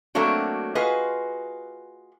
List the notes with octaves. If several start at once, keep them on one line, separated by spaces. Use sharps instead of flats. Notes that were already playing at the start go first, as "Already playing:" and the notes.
F#3 A3 A#3 C4 D4 F#4
F4 F#4 G#4 B4 D#5